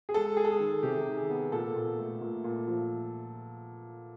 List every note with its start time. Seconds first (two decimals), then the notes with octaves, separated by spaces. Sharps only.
0.09 G#4
0.14 G#3 A4
0.37 G#3 G#4
0.45 A4
0.51 G#4
0.60 D#3
0.83 C3 G4
1.06 D#3
1.17 G#4
1.29 B3
1.52 A#2 A4
1.76 A#2
1.98 A3
2.21 A#2
2.44 A#2
2.67 F3